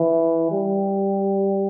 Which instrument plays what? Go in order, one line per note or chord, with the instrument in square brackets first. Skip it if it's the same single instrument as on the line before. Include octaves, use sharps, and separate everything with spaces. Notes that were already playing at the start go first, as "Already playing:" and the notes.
Already playing: [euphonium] E3
G3